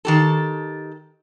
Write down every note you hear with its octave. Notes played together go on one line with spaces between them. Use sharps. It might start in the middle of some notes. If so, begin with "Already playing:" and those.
D#3 G4 A4